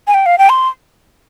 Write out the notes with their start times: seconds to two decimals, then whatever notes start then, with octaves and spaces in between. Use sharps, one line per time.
0.07 G#5
0.14 G5
0.26 F5
0.38 G5
0.49 C6